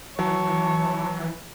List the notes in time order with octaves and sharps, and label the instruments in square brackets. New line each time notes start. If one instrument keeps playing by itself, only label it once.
[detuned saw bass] E3 [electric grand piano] F#3 [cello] C#5 [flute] A5